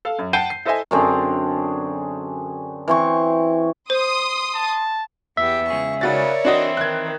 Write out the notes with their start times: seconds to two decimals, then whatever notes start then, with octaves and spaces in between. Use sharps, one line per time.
0.05 A4 F5
0.19 F#2
0.33 F#5 G5 A5 G6 C7 D#7
0.50 C7
0.65 E4 A4 C5 D#5 E5 G#5
0.91 F#2 D3 C4 G#4
2.88 E3 C4 C#6
3.90 C5 C6 D#6
4.55 A5
5.37 E2 B3 G4 E5
5.70 C#2 G#4 C#6
6.01 C#3 F#4 A#4 C#5 D5 A6
6.45 E3 C4 D4 E4 F#4 D#5
6.77 D#3 F#6 G#6